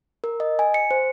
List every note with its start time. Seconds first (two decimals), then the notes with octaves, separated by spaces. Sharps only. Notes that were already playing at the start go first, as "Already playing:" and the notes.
0.24 A#4
0.40 D#5
0.59 G#5
0.74 C#7
0.91 C5